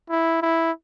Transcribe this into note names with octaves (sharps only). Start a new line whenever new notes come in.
E4
E4